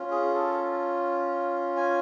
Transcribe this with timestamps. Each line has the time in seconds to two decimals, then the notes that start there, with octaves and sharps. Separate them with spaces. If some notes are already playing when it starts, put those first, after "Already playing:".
Already playing: C#4 F4
0.11 G#4
0.35 A4
1.77 G#5